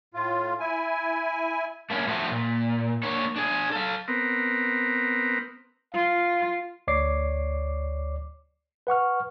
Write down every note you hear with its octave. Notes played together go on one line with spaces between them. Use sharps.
A2 F4
E4 G#5
A3 A#3 C#4 D4 E4
F3 A3 C4 F#4
A#2
A#3 D4 C#5
D4 G#4
A4 F5
B3 C4 A#4
F4 F5
D2 C#5 D5 D6 C7
B4 F#5 C#6 F6